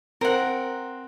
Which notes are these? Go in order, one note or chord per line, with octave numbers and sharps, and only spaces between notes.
C4 A#4 F#5